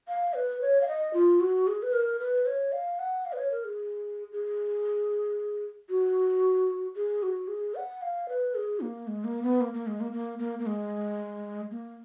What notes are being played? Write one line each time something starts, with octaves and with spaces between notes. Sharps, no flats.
F5
B4
C#5
F5
D#5
F4
F#4
G#4
B4
A#4
B4
C#5
F5
F#5
F5
B4
C#5
A#4
G#4
G#4
F#4
G#4
F#4
G#4
F#5
F5
B4
G#4
A#3
G#3
A#3
B3
A#3
A#3
G#3
A#3
A#3
A#3
A#3
G#3
A#3